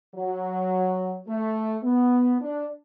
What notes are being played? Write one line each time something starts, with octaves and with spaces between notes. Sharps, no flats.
F#3
A3
B3
D4